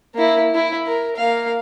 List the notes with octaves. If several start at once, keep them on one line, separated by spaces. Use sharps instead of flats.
A#3 E4
E4
A#4
A#3 F5